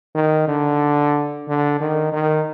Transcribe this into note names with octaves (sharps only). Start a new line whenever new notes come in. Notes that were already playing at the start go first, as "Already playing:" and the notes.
D#3
D3
D3
D#3
D#3